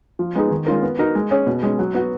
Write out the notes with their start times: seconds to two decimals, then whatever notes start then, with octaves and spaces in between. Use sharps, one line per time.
0.19 F3
0.35 G#3 B3 D#4 G#4
0.51 D#3
0.66 G#3 C#4 F4 A#4
0.83 B3
0.99 D#4 F#4 A#4
1.15 G#3
1.31 C#4 G#4 C#5
1.47 B2
1.63 G#3 C#4
1.79 F#3
1.95 B3 F#4